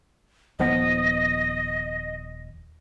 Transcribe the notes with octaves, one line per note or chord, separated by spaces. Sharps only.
D#1 F3 B3 D#5